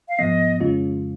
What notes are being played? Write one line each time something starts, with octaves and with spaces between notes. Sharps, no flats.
F5
G#2 F3 B3 D#5
F2 C#3 G#3 C#4 F4